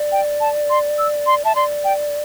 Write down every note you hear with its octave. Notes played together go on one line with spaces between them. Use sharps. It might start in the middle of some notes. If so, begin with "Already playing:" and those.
Already playing: D5
G5
A5
C6
E6
C6
E5 A5
D5 C6
G5